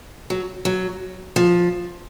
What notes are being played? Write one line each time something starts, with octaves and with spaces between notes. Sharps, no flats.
F#3
F#3
F3